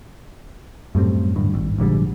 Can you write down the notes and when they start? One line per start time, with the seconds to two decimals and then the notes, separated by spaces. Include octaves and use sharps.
0.95 F#2 A2 G3 C4
1.36 D1 G2
1.54 G#1
1.78 A#1 G#2 D3 G3